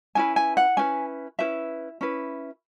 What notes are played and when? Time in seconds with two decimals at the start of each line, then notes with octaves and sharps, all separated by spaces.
0.15 C#4 E4 B4 G#5
0.36 G#5
0.57 F#5
0.77 C#4 E4 B4 G#5
1.39 C#4 E4 B4 E5
2.01 C#4 E4 B4